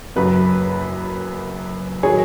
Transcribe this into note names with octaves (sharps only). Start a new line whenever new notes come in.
F#1 F#2 F#3 F#4 B4
D#3 F#3 G#4 C#5